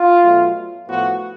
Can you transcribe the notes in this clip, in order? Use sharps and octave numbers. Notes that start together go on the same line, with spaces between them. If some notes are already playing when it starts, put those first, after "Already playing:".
Already playing: F4
B2 F#3 A3
A2 F3 B3 F#4